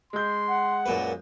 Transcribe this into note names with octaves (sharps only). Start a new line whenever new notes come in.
G#3 C6 G6
F#5
F#2 A#2 B4